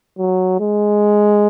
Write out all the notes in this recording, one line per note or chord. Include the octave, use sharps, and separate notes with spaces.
F#3
G#3